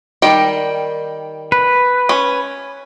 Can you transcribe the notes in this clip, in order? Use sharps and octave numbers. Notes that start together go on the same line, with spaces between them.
D#3 G3 G5
B4
C#4